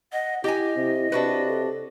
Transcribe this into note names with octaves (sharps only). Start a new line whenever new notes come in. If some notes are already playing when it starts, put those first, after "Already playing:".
D#5 F#5
E4 G4 D#5 G#5
C3
C3 D4 F#4 B4
A4